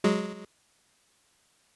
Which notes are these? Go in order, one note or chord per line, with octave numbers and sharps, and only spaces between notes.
F#3 G#3